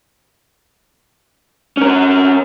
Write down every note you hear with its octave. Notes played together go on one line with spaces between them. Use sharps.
C#4 A#4